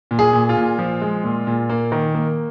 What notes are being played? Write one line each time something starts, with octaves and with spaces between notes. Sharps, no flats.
A#2
G#4
A#2
F4
A#2
F3
G#3
A#2
A#2
A#3
D#3
A#3